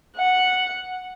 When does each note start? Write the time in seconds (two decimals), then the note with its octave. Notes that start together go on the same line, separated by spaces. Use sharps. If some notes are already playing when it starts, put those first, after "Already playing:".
0.16 F#5